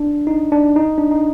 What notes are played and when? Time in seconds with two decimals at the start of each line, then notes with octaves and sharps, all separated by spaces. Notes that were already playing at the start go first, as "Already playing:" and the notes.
Already playing: D4
0.27 D#4
0.52 D4
0.76 D#4
0.98 D4
1.11 D#4